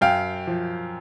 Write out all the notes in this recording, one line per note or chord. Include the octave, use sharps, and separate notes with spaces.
F#2 F5 G5
F3